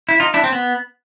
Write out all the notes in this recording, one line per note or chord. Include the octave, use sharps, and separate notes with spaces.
E4
D#4 F4
D4 E4
C4
B3